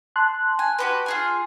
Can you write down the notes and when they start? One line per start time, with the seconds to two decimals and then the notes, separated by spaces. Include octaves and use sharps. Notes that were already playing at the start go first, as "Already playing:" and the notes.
0.16 A5 C6 F#6
0.59 G#5
0.78 F#4 G4 B4
1.06 F4 G#4 G#5